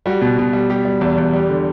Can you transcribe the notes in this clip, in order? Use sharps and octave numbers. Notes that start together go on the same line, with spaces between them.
G3 F#4
B2
B2
G3
G3 G4
G3
E2
E2
G3
D3